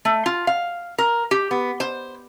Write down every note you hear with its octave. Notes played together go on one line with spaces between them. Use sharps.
A3
F4
F5
A#4
G4
B3
C5